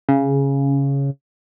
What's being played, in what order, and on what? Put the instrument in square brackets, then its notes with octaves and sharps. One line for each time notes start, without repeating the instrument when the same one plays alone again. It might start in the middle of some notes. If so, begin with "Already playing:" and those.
[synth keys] C#3